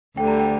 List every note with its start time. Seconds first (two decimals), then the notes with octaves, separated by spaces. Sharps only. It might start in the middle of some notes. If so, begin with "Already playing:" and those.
0.17 D2 D3 G3 G5
0.27 A#5
0.39 G5